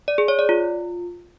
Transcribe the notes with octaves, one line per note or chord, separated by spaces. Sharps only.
D5
G#4
C#5
D5
F4